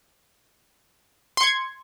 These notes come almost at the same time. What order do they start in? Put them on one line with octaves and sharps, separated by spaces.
C6 C#7 G#6